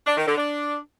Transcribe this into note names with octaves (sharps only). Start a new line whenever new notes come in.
D4
D#3
D3
D4